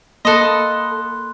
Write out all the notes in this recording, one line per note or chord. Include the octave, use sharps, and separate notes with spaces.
A#3 A4 D#5 B5 C6 F#6